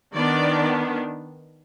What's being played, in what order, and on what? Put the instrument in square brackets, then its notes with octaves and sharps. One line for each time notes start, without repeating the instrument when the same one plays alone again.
[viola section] D#3 B3 D4 D5